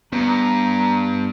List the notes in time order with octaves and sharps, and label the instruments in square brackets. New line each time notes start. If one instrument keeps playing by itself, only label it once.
[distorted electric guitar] G2 [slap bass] B3 [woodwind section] A#5